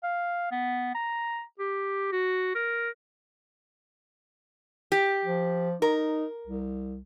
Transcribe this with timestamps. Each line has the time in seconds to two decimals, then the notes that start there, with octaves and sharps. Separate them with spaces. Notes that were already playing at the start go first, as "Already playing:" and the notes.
0.03 F5
0.51 B3
0.95 A#5
1.59 G4
2.12 F#4
2.55 A#4
4.92 G4
5.25 F3
5.82 D#4 A#4
6.47 C2